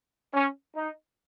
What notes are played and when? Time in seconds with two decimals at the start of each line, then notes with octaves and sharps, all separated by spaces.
0.33 C#4
0.76 D#4